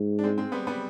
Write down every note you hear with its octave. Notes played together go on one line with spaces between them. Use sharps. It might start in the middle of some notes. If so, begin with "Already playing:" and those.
Already playing: G#2
D4
G#3 C4
G#3 C4
G3 B3
G3 B3